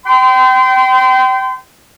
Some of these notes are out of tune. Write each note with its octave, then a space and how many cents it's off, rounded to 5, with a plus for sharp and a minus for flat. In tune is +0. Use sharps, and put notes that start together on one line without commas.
G5 -25 C6 -35